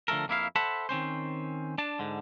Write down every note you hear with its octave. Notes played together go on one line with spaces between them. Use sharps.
D3 F3 A3 A4 A#4
F2 A#3 E4 F5
A4 C5 E5 F#5 A5 B5
D#3 C4 C#4 C5
D4 A5
G#2 D3